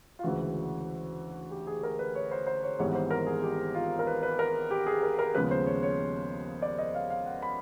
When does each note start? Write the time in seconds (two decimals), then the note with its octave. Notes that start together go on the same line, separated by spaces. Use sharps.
0.19 F4
0.23 D2 C#3 E3 G#3 F#4
1.51 G4
1.67 G#4
1.83 A#4
1.99 B4
2.15 C#5
2.31 C5
2.46 C5
2.63 C#5
2.79 G#1 G#2 E3 G3 B3 C#5
2.95 C5
3.11 A#4
3.27 G#4
3.43 G4
3.75 F4
3.99 A#4
4.07 B4
4.23 B4
4.39 A#4
4.71 G4
4.86 G#4
5.03 A#4
5.19 A#4
5.35 D#2 C#3 F3 G#3 B3 B4
5.51 C5
5.66 C#5
5.83 C#5
6.62 D5
6.78 D#5
6.95 F5
7.10 F5
7.26 F#5
7.42 B5